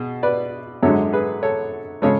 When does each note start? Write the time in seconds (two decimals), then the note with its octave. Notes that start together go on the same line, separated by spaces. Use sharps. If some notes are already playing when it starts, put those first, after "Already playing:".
Already playing: B2 G#4
0.23 B4 D5
0.83 F#2 D3 G#3 A4 C#5
1.13 G#4 B4
1.43 A4 C#5
2.02 C#3 G#3 A4 C#5